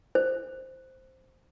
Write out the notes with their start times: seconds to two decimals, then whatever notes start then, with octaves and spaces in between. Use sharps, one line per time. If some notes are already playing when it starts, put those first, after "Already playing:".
0.15 C5